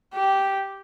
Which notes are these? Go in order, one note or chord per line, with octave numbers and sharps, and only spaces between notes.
G4